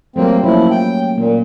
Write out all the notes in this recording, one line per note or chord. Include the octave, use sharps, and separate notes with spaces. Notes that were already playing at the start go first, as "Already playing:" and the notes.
F#3 G3 A3 A#3 C4
F3 A#3 C#4 E4 C#5
G5
A#2 A#3